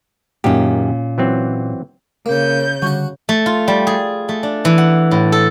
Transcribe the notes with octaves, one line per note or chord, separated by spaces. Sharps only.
F#2 A#2 D#3 C#4 G4
E3 F#3 C4
C#3 A#3 G6
D3 G3 F#4 F#5 C#6
A3
F4
G3
G#4
A3
D4
E3
F#5
A2
A4